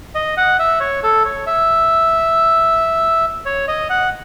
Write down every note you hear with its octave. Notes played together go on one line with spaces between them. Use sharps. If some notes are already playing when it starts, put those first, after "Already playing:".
D#5
F#5
E5
C#5
A4
C#5
E5
C#5
D#5
F#5